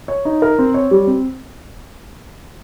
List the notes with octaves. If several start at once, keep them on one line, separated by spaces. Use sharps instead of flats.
C#5
D#4
A#4
C4
C#5
G3
C4